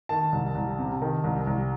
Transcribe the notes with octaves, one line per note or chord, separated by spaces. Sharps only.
D#3 A5
C2
C2
C3
D#3
C2
C2